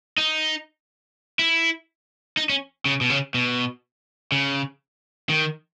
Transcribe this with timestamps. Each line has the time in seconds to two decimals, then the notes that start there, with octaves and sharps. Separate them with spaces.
0.18 D#4
1.39 E4
2.37 D#4
2.49 C#4
2.86 C#3
3.01 B2
3.10 C#3
3.34 B2
4.32 C#3
5.29 D#3